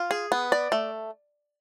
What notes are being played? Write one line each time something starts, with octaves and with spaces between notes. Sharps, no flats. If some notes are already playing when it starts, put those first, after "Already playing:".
Already playing: F4
G#4
B3
D5
A3